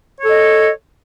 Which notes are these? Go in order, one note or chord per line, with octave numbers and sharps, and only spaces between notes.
A4 C#5 D#5